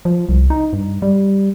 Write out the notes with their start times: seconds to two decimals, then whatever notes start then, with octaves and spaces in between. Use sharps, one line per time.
0.05 F3
0.29 C2
0.50 D#4
0.73 G2
1.02 G3